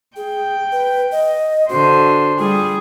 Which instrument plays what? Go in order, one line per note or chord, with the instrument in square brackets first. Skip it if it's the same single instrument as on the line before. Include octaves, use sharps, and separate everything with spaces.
[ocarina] G#4 [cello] G5
[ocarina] B4
D#5
[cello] D3 C5 [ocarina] F#4
[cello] G3 G#4 [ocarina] F4